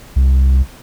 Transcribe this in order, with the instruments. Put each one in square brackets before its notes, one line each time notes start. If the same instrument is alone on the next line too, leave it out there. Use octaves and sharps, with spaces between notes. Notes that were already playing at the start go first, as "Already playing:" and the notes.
[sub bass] C2